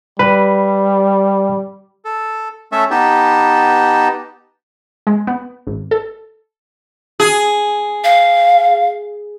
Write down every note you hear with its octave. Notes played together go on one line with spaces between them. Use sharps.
G3 B4
A4
A3 C#4 A4 E5
B3 D#4 G4 A5
G#3
B3
G#1
A4
G#4
F5